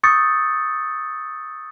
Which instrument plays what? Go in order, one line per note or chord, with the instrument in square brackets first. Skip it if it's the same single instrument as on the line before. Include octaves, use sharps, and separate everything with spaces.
[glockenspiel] C#6 D#6 E6 G6 A6 C#7